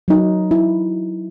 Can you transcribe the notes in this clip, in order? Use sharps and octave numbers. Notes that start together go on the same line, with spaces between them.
F#3 D#4
E4